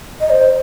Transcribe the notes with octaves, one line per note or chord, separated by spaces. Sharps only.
D#5
C5